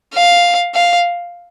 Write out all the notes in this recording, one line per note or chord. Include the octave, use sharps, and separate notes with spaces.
F5
F5